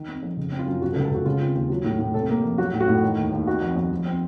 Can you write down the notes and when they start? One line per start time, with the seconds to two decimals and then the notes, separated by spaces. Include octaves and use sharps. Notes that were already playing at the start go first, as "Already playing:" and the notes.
Already playing: D#3
0.08 C4
0.23 F2
0.37 C#3
0.52 C4
0.59 F4
0.66 F#2
0.81 C3 F#4
0.92 A4
0.96 C#2
1.04 A4
1.11 C#2 F#4
1.25 C#3 F4
1.41 C4
1.55 D#2
1.70 F#3
1.84 A2
1.99 A2
2.14 C3 A4
2.29 A#3
2.44 F2
2.58 F#3 F#4
2.73 A2
2.81 F#4
2.88 A2
3.02 D#3
3.17 D#2
3.32 D#2
3.47 D#3 F#4
3.62 F2
3.76 F2
3.91 F3
4.05 C4